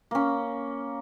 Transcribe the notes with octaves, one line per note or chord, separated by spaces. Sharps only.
A#3 C#4